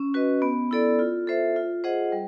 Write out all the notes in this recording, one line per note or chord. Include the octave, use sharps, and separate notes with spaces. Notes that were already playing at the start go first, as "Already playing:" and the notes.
Already playing: C#4
F#4 B4 D#5
B3
E4 A4 D5
F4
A4 C5 E5
F4
G#4 C5 D#5 F#5
G3